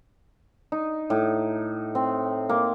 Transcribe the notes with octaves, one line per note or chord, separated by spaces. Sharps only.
D#4
A2
C4
A#3